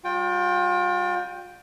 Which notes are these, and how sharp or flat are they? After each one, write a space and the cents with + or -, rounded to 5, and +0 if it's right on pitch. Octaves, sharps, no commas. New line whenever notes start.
G3 +0 F4 +40 G5 +0